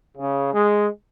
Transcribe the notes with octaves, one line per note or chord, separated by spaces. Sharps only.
C#3
G#3